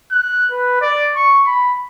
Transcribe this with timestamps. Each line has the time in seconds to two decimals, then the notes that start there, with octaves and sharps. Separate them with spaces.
0.12 F#6
0.51 B4
0.81 D5
1.16 C#6
1.47 B5